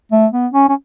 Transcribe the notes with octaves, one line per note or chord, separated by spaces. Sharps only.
A3
B3
C#4
C#4